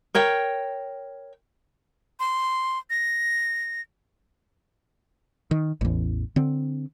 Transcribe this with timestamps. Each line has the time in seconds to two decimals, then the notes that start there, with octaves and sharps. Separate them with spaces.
0.15 A#4 C#5 G5
2.20 C6
2.90 A#6
5.51 D#3
5.81 A1 E2
6.36 D3 C4